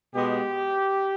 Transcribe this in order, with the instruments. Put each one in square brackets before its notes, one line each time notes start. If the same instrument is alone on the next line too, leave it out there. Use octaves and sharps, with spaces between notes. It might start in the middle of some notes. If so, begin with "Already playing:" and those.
[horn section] B2 G#3 B3 G4